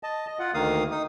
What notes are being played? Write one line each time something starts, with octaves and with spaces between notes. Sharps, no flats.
D#5 A5
D#5
F4 F#5
D2 D#3 A#3 F5 D#6
D#4 D#6